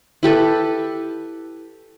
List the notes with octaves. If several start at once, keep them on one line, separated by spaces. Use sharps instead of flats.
E4 G4 A4 B4